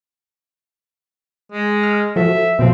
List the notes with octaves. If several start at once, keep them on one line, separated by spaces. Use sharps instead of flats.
G#3
F6
F3 F#4 A4 E5
B2 F3 C4